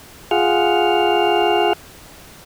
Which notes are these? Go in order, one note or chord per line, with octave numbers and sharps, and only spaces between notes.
F4 G#4 F#5 F6